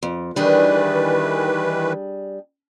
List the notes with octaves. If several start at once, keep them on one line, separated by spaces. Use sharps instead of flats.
F2
D#3 E3 G3 D4 G#4 B4